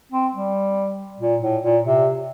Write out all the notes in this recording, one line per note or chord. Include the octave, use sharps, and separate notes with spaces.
C4
G3
A#2
A2
A#2
C3